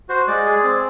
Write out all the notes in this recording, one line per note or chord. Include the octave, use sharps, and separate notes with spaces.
F#4 C5
G#3 D5
G#4
C4